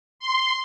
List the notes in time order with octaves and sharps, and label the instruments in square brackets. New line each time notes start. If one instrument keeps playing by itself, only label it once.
[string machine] C6